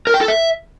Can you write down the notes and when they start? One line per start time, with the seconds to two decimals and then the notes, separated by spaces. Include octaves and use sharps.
0.07 A#4
0.14 G5
0.21 A4
0.28 E5